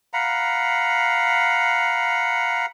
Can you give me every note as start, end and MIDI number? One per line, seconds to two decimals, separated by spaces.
0.13 2.66 77
0.13 2.66 78
0.13 2.66 82
0.13 2.66 83